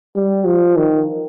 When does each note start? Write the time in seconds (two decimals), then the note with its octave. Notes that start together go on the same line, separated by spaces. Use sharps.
0.16 G3
0.46 F3
0.77 D#3